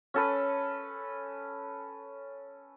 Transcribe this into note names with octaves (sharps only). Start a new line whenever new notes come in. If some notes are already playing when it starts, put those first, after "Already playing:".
C#4 A4 B4